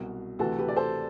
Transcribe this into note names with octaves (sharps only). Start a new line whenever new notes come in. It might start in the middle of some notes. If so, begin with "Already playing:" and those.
Already playing: C2 B2 F#3
D2 C3 E3 F#4 A4
G4 B4
D5
A4 C5